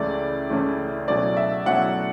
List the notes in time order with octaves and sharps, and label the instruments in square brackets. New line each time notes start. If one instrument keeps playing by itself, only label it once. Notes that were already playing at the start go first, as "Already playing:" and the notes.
Already playing: [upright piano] C#2 C#3 E3 A3 E4 D5
C#2 C#3 E3 A3 E4
B2 F#3 A3 C#4 E4 D5
E5
B2 F#3 A3 C#4 E4 F#5